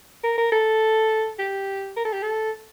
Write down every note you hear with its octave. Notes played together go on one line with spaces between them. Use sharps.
A#4
A#4
A4
G4
A#4
A4
G4
A4